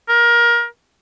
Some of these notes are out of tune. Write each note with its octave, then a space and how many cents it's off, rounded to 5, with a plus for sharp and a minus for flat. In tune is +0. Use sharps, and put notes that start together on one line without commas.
A#4 +25